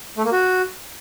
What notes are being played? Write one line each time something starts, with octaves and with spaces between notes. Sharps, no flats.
A3
A#3
F#4